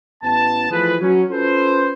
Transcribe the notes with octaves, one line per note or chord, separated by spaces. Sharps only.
A1 B3 A5
E3 F3 A3 F4 G#4 B4
F#3 C#4
C#4 F4 A4 B4 C5